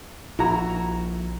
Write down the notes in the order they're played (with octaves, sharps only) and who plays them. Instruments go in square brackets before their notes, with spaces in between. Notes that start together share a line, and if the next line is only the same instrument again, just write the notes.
[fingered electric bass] A#1 [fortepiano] E4 F#4 A#5